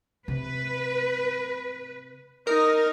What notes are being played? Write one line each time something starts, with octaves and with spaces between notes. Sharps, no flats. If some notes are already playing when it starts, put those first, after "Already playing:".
C3 B4
D#4 A#4 D#5